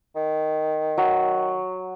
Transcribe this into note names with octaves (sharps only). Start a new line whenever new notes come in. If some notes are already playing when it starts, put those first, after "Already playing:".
D#3
F#3